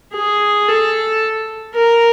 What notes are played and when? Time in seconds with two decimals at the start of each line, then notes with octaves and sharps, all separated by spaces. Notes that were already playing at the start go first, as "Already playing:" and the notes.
0.14 G#4
0.69 A4
1.75 A#4